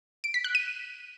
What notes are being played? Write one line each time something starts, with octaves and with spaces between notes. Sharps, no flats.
D7
B6
F#6
D#7